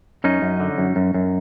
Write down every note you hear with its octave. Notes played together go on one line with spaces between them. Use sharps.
F#2 C#4 D#4
F#2
D3
F#2
F#2
F#2